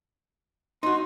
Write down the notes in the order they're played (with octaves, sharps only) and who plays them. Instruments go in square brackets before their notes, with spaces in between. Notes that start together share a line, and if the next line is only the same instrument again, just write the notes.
[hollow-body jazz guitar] D#4 F#4 [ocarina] C6